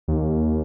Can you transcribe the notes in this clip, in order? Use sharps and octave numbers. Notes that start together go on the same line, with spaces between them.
D#2